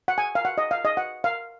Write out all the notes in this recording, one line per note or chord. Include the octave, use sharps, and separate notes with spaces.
F#5
G#5
F5
F#5
D#5
F5
D#5
F#5
F5